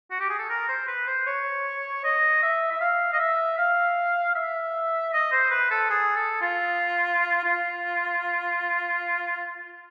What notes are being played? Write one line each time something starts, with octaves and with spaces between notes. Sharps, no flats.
F#4
G4
G#4
A4
A#4
C5
B4
C5
C#5
D#5
E5
E5
F5
D#5
E5
F5
E5
D#5
C5
B4
A4
G#4
A4
F4
F4